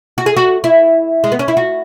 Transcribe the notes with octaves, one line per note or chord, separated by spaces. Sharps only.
F#4
G#4
F#4
E4
G#3
B3
C#4
E4
F#4